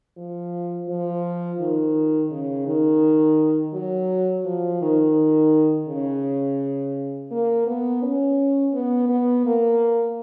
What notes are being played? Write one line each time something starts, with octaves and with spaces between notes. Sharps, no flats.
F3
F3
D#3
C#3
D#3
F#3
F3
D#3
C#3
A#3
B3
C#4
B3
B3
A#3